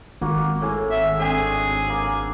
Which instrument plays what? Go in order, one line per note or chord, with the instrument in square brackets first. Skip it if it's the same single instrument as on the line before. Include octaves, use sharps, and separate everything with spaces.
[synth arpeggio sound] G#1 [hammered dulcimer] A#3 F#4
[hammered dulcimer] A2 G#4
[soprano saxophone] E5
[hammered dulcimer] C4 D4 [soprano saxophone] G#4
[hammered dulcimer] A#3